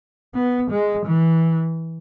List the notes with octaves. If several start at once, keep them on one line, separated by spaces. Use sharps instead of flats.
B3
G#3
E3